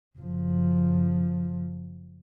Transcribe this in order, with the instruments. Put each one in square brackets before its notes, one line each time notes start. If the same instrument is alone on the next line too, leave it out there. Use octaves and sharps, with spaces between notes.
[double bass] F#1 F3